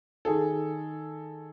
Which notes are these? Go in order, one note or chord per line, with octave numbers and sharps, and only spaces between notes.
D#3 G#4 A4